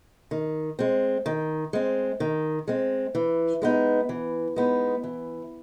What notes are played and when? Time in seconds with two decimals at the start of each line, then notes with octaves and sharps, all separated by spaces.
0.31 D#3
0.79 G#3 C4
1.26 D#3
1.73 G#3 C4
2.20 D#3
2.68 G#3 C4
3.15 E3
3.62 G#3 B3 D#4
4.09 E3
4.56 G#3 B3 D#4
5.04 E3